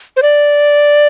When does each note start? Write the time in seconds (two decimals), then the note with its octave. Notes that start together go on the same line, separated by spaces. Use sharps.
0.16 C5
0.22 D5